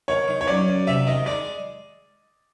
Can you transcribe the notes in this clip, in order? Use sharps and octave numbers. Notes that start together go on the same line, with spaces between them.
D#3 C#5
D#3
C#5
F#2 D5
F#2
C3 E5
D#3 D#5
G#3 D5